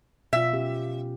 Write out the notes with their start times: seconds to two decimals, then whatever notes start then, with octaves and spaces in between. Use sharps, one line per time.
0.33 B2 F4 E5
0.53 C#4 G4